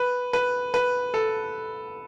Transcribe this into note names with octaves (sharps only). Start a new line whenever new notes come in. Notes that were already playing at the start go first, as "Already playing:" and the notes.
Already playing: B4
B4
B4
A4